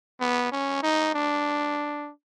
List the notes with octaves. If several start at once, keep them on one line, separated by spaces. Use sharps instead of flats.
B3
C#4
D#4
D4